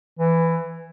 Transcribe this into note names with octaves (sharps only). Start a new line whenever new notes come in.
E3